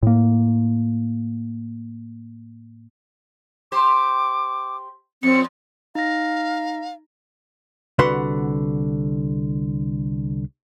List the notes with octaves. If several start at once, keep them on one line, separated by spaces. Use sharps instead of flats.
A2 A#3
G4 C5 D6
F2 A#2 C4 C#7
D#4 F5 A#6
C2 D3 F#4 B4 F#5 C6